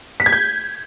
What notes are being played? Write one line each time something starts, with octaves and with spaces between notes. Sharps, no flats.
B6
G#6
G6